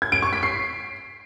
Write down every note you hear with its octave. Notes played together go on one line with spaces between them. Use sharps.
G#6
D7
C#6
B6
C7